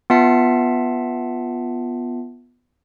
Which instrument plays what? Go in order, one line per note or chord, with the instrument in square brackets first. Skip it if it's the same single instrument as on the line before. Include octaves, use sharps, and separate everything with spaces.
[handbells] B3 F4 E5 A5 C7 C#7